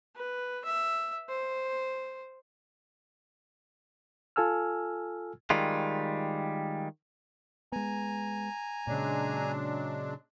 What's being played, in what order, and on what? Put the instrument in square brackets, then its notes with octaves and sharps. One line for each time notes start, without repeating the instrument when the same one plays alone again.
[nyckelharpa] B4
E5
C5
[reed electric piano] F4 A4 G#5 E6 F6
[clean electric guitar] D#3 G3 G#3 F4
[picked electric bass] G#3 B3 [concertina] G#5 A#5
[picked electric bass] A#2 C#3 [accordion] F#3 G#3 D4